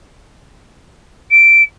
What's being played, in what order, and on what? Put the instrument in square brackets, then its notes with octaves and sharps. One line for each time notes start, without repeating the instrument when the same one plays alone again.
[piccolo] D7